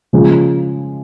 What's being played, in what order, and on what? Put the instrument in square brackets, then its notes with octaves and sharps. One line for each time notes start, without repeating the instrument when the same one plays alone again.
[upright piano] C#3 F3 G#3